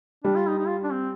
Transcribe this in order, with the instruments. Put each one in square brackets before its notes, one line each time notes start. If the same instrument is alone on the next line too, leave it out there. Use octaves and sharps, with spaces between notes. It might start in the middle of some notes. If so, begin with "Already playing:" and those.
[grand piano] G3 [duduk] D4
[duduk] F4
D#4
D#4
F4
D4
C4